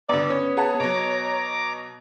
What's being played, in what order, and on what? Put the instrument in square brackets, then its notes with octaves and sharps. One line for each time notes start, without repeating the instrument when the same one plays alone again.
[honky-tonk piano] G2 D3 [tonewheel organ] B3 [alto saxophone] D5
[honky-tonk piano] C#4 [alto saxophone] C#5
[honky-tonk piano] G#4 F#5 A5
[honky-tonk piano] B2 F#3 [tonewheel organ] A#5 D6